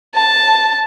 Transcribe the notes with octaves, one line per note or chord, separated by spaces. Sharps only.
A5